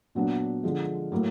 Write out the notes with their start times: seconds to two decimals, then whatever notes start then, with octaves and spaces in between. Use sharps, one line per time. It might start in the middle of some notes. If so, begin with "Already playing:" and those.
0.15 A#2 F#3 B3 D4
0.64 D3 F3 G#3
1.12 A2 F#3 A#3